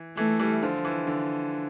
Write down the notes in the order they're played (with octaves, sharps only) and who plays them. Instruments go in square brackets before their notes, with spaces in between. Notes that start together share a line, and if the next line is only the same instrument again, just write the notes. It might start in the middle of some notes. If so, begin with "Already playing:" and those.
Already playing: [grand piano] E3
[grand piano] E3 [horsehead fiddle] A3
[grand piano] E3 G3
D3 F3
E3
D3